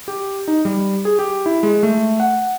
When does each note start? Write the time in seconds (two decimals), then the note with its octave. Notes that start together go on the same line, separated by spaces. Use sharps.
0.08 G4
0.48 D#4
0.65 G3
1.05 G#4
1.19 G4
1.46 E4
1.63 G#3
1.83 A3
2.20 F#5